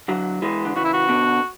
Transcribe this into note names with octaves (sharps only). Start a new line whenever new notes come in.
D3 F#3
E3 G#3
D3
C#3 E3 F#4
E4
F#4
B2 D3